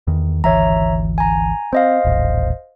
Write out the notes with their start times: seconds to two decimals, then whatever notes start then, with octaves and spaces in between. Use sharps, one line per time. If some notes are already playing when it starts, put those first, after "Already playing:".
0.07 E2 D#3
0.44 G#1 D2 E3 C#5 E5 A#5
1.18 G#5 A#5
1.73 C4 C5 D#5 F5
2.05 D#1 A1